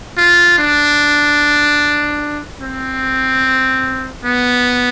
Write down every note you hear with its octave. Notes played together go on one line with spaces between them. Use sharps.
F4
D4
C4
B3